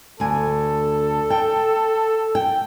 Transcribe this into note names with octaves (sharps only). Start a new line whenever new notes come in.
D2 A4 G#5
G5
G5